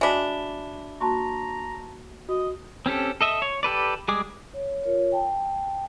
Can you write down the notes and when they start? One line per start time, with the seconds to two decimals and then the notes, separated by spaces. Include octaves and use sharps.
0.01 G#3 D4 F#4 E5 B5 B6
1.01 A#3 F#4 A5 A#5 C6 C#6
2.29 F#4 D#5
2.86 C4 C#4 G4 A4
3.21 A4 D#5 E5
3.42 C#5
3.63 G4 A4 B4 D5
4.08 G3 G#3 G#4 D6
4.54 C#5
4.84 F4 A#4 C#5
5.12 G5 A5